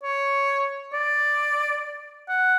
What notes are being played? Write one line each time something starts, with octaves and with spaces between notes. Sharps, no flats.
C#5
D5
F#5